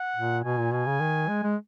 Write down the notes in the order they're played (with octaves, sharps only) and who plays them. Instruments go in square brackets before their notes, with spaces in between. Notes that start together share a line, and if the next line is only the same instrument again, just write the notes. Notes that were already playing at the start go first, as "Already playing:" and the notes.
Already playing: [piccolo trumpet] F#5
[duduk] A#2
[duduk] B2 [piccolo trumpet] G#5
[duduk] A#2
[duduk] B2 [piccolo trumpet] G#5
[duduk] C#3
D#3
G#3
G#3